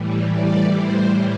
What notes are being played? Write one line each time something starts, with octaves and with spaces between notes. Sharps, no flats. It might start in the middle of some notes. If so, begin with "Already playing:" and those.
Already playing: A2 E3 G3
D5
C5